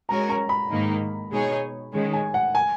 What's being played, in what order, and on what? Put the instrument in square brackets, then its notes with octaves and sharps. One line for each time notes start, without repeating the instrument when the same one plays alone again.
[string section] G#3 C#4 F#4 A#4 [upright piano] A#5
[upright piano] A#5
B5
[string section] G#2 D#3 A#3 D#4
B2 G#3 D#4 G#4 C#5
D#3 G#3 C#4
[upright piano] G#5
F#5
G#5